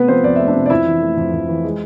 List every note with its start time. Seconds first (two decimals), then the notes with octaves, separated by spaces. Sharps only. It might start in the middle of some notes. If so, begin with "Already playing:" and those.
Already playing: C3 A3 B3 B4
0.08 F3 C4 C5
0.24 F2 D5
0.36 A3 E5
0.48 D4 D5
0.55 C3
0.66 D5
0.70 F2 E4 E5
0.86 E3
1.02 A3
1.17 F2
1.33 F2
1.49 E3
1.64 G#3